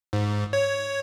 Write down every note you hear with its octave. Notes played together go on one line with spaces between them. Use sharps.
G#2
C#5